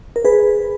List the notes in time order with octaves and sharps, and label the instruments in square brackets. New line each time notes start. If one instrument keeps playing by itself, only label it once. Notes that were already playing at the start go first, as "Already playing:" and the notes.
[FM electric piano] A#4
G#4 B4